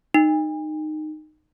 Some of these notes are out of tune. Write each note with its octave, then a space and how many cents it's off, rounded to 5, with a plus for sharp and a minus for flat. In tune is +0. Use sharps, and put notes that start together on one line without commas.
D#4 -15